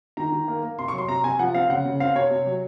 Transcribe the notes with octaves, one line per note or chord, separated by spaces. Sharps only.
D#3 A#5
D#3
A#3
A#3
C3 C6
C#6
F#3
C6
C3 A#5
C3 G#5
F3 F#5
C4 F5
C#3 F#5
C#3
C4 F5
C3 C#5
C3
F#3